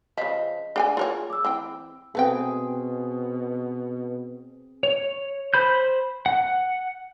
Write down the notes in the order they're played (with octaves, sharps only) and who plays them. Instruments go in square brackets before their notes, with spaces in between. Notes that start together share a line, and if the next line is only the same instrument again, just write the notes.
[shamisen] C#3 F3 [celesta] D#5 B6
[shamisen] D4 G5 G#5 [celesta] G#4
[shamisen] F4 A#4 C#5
[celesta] D6 E6
[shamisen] E3 C4 G5
[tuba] B2 [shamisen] A3 B3 G5 [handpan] C4 G#4
[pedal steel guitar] C#5
C5 B5 G6
F#5